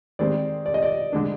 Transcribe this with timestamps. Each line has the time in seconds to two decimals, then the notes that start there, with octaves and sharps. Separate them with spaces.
0.19 D#3 G#3 C4 D5
0.66 D5
0.74 D#5
0.83 D5
1.12 D3 G#3 D4